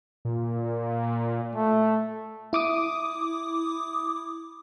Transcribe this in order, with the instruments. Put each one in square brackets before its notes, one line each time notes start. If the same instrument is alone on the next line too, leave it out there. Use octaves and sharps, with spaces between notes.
[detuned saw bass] A#2
[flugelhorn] A3
[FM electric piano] E4 D6 D#6